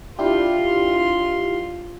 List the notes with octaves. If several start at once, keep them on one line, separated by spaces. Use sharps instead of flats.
D4 E4 F4 G4 C6